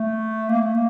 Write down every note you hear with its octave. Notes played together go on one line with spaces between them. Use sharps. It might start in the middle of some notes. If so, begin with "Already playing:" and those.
Already playing: A3
A#3
A3
A#3